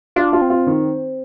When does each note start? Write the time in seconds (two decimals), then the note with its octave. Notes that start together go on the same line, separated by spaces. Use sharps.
0.16 D4 F4
0.33 F4
0.42 C4
0.50 F4
0.67 D#3